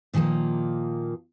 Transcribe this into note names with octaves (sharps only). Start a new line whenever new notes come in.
A#2 D#3 F3 G3 A#3